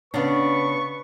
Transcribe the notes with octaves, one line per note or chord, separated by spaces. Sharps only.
C#3 B3 D4 B4 C#6